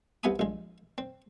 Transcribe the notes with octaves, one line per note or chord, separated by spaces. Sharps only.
C2 C3 B3 G#5 B5 D#6
A#1 G#3
C4